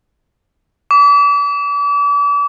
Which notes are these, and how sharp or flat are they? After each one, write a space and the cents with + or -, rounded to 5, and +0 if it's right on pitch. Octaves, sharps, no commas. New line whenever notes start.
D6 -40